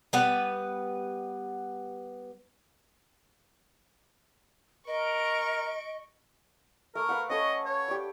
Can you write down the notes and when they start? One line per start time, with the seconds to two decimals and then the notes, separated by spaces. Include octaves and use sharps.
0.13 G3 B3 B4
4.87 A#4 D#5 C#6 D7
6.95 A3 A#4
7.09 B4 F5 F#5
7.30 C#4 A4 D#5 C#6
7.66 C#5
7.88 G4 D5